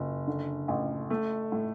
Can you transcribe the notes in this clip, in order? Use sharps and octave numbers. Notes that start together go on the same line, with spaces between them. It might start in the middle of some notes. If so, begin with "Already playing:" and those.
Already playing: F#1
D3
A1
A3
A2